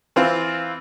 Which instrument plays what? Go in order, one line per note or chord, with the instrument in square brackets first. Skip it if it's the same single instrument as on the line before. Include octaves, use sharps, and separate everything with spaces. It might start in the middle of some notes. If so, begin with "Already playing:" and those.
[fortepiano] E3 C4 F4